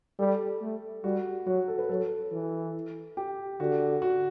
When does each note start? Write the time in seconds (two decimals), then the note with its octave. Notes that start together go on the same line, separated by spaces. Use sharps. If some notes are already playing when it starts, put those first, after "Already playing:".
0.19 G3 A4
0.61 A3
1.04 G3 F#4
1.46 F#3 F#4
1.68 A4
1.78 B4
1.89 F#3 A4
2.32 E3
3.17 G4
3.60 D3 F#4
4.02 F#4